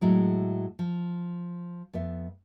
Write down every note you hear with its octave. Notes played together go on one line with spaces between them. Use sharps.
A2 F#3 G#3 E4
F3
F2 B3 E5